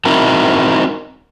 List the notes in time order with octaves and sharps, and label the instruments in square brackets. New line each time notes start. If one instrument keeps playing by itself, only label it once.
[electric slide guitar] C4 D#4 E4 F#4 A#4